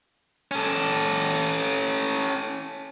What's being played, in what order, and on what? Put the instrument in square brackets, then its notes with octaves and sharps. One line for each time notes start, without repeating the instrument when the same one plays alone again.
[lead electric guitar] C#4 A4